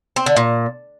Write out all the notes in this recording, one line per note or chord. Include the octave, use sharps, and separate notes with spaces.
C4
D3
A#2